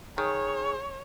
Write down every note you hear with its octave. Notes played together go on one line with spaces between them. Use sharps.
D#3 G#4 C#5